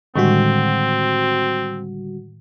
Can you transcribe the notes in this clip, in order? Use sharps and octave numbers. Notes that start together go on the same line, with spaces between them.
A2 D3 D#3 G3 G#3 C4 F#4